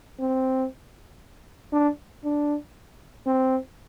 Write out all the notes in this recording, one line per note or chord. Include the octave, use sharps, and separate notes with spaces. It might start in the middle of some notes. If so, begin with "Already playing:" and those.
C4
D4
D4
C4